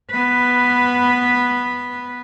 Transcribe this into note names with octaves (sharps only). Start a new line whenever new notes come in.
B3 B4